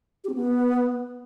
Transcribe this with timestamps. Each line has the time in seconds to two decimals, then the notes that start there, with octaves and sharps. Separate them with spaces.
0.24 G4
0.29 C4
0.34 B3